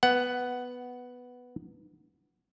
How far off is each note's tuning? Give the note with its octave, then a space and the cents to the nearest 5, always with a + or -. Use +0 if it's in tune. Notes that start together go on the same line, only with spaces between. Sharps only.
B3 +0 F#5 +10